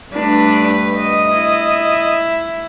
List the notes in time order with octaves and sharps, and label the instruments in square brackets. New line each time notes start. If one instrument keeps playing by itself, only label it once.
[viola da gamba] G2 A3 B4 [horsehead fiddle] D4
[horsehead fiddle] D#5
[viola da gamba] E4